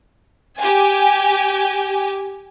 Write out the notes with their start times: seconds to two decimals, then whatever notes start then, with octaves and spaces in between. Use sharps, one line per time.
0.58 G4 G#5